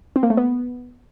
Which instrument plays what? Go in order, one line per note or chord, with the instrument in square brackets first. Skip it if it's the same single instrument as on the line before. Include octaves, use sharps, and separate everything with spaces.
[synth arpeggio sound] C4
A#3
A3
B3